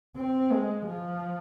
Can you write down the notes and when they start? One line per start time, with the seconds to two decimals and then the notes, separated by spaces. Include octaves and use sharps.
0.17 C4
0.52 G#3
0.86 F3